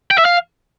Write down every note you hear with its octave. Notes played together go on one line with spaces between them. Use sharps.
G5
E5
F5